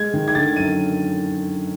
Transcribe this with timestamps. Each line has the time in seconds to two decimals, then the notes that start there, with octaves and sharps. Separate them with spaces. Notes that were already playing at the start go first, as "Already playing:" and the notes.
Already playing: G#3 G#6
0.14 D#3
0.28 G#6
0.35 D3 A6
0.56 F#2 D#7